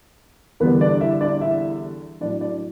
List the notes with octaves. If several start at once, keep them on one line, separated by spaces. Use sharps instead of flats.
E2 D3 G3 B3 B4
D4 D5
E4 E5
D4 D5
E4 E5
A2 F#3 A3 D4 D5
D4 D5